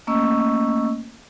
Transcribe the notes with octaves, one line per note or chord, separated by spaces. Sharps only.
A3 A#3 C#4 D#5 C#6 E6